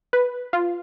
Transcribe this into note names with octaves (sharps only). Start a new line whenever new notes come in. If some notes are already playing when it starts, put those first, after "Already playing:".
B4
F4